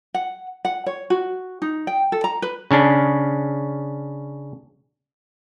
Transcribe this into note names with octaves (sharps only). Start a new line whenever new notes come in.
F#5
F#5
C#5
F#4
D#4
G5
A4
A#5
B4
C#3 C#4 D4